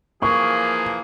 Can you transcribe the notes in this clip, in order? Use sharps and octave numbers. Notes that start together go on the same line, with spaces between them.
E3 F3 A#3 G#4 C#6